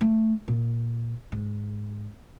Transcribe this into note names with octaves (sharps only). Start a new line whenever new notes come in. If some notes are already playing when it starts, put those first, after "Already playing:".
A3
A#2
G#2